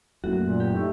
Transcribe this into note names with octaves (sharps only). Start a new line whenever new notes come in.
F#2 A3 A#3 E4 F#4
A#2
G4
A3 D#4